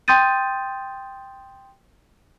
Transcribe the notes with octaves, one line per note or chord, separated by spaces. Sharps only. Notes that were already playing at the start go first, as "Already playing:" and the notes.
G5 C6 D#6 G6 A6 D#7